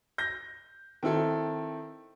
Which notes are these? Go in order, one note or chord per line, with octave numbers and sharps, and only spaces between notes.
G6 A#6
D#3 C4 E4 A4